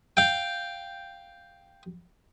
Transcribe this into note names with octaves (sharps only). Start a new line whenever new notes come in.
F5 G5